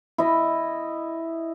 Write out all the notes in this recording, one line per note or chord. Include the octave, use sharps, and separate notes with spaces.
E4 D#5